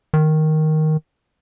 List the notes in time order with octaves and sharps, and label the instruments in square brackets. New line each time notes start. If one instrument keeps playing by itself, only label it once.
[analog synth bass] D#3